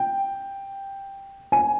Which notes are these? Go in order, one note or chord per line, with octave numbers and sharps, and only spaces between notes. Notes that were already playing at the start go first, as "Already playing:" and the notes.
Already playing: G5
G#5